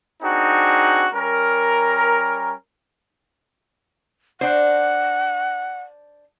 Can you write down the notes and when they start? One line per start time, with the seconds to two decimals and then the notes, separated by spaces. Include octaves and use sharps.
0.22 C4 D4 D#4 F#4 G#4
1.14 G3 C#4 A#4
4.41 D4 C5 F#5